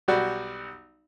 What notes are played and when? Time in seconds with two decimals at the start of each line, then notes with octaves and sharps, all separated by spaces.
0.08 B1 G3 F#4 D5